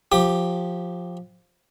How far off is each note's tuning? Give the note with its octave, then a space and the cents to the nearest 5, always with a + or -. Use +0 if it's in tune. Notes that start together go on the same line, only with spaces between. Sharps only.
F3 +10 G4 +0 D6 +35